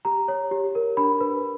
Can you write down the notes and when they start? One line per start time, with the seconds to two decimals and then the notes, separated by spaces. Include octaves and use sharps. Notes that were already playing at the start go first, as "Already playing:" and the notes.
0.05 G4 A#5
0.28 C#5
0.51 G4
0.75 A#4
0.97 D4 B5
1.21 B4